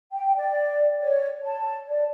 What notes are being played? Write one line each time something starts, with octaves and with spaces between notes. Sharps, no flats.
G5
D5
C#5
A5
D5